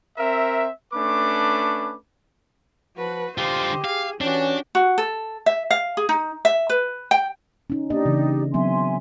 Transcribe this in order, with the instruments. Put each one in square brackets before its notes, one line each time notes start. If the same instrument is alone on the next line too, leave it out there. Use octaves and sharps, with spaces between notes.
[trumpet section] C4 A#4 E5
A3 C#4 D4 B4 D6
[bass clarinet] F3 [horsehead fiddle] F#4 B4
[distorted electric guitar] D3 F4 [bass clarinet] G4 [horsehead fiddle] C5 D#5
[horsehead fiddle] G#4 [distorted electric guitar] F5
[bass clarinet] E3 [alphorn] C#4 [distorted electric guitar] D4 [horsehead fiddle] F#4 G4
[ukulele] F#4
A4
E5
F5
G#4
D#4
E5
B4
G5
[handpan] C#4 D#4
[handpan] A#3 D4 D#5 [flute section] D#4 G4 D5
[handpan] C#3 E3
[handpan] F#3 B3 C4 [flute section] E5 G#5 C6